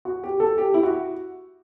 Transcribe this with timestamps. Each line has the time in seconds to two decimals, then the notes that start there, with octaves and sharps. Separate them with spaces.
0.05 F#4
0.24 G4
0.40 A4
0.58 G4
0.74 E4
0.83 F#4